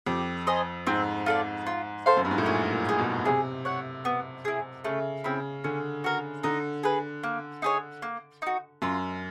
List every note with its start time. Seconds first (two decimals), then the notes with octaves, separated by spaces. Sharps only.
0.07 F2 G4
0.47 C5 D#5 G#5
0.87 G#2 C4
1.26 F4 A4 D5
1.67 F4
2.06 A4 C5 F5
2.17 F#2
2.25 G2
2.31 G#2
2.38 A2
2.45 A#2 C#4
2.72 A#2
2.85 F4
2.89 G#4
2.99 B2
3.25 C3 G#4
3.65 C#5 F#5
4.05 B3
4.45 E4 G#4
4.84 C#3 A3
5.24 C#3 C4 E4
5.64 D3 C#4
6.04 F#4 A#4
6.44 D3 D#4
6.83 G#4 B4
7.23 A#3
7.62 D#4 G#4 C#5
8.02 A#3
8.42 D#4 F#4
8.82 F#2 F4